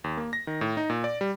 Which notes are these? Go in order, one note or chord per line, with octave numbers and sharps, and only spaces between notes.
D#2
A#3
A#6
D#3
A2
D#4
A#2
D5
G3